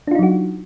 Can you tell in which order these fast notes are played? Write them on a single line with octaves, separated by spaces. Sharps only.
D4 F4 D#4 F#3 F#4